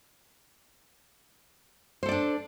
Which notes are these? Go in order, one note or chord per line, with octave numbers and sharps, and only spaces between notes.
D4 A4 C5 D5